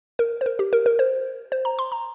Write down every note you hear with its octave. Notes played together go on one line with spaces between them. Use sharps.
A#4
C5
A#4
G4
A#4
A#4
C5
C5
A#5
C6
A#5